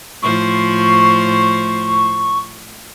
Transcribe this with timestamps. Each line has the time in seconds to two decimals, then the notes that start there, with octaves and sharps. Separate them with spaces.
0.22 A2 F3 C5 C#6